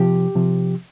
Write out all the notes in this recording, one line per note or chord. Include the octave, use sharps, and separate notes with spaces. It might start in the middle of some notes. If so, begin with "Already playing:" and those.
Already playing: C3 F3 G4
C3 F3